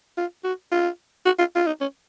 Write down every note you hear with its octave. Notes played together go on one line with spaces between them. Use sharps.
F4
F#4
F4
F#4
F4
F4
D#4
C#4